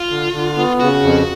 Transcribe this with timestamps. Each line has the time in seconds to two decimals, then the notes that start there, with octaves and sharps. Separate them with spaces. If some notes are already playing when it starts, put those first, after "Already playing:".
Already playing: F4
0.09 D3
0.33 D3
0.56 B3
0.80 C#3 F#4
1.03 F2